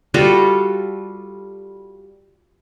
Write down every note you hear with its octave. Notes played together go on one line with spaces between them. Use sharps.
G3 F4 F#4 A4